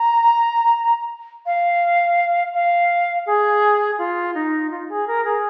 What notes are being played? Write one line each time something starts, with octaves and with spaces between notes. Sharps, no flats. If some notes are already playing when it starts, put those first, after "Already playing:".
Already playing: A#5
F5
F5
G#4
F4
D#4
F4
G#4
A#4
G#4